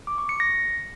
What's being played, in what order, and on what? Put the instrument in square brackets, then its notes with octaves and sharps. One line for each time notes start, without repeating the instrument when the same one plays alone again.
[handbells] D6
C#6
C#7
A#6